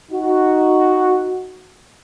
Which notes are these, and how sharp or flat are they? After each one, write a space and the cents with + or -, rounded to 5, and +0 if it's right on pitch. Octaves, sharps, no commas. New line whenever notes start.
D#4 +0 F#4 +0